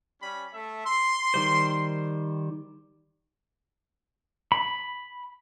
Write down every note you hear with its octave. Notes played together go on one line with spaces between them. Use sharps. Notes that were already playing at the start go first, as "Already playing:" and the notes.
G3 C#4 B5
A3 E5
C6
D#3 G3 C5
B5